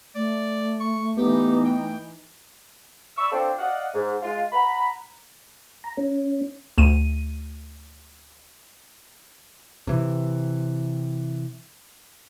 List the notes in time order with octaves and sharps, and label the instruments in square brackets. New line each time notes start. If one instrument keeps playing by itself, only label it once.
[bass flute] A3 [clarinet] D5
[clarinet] C#6
[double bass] E3 D#4 [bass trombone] B3 [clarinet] G4
[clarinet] G5
[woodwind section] D5 B5 C#6 E6
C4 D4 F4 A4 C5
D5 D#5 F5 F#5
G#2
G#3 F4
F#5 A#5 B5
[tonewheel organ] A#5
C#4
[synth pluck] D2 D#7
[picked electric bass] C3 E3